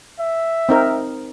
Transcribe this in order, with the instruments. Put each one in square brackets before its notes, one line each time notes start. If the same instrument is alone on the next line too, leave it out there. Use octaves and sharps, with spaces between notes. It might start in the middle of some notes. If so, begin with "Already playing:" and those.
[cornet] E5
[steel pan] C4 D#4 A#4